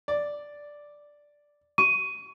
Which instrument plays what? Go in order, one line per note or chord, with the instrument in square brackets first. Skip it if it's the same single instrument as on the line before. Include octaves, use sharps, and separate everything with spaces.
[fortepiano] D5
[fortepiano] C#6 [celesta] D#7